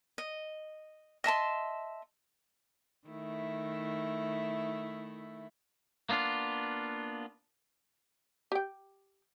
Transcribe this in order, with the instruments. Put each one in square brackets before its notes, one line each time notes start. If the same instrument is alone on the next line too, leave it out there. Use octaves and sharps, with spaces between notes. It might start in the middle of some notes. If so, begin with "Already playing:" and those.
[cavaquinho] D#5
D#5 E5 A5 C6
[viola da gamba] D#3 A3 E4
[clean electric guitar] A#3 B3 D4 F4
[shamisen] G4 G5